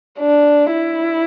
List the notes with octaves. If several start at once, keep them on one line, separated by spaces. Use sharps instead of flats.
D4
E4